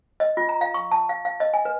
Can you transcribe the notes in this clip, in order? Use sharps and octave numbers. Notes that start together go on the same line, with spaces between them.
D#5
F4
A#5
F5
C#6
A5
F5
F5
D#5
G#5
B4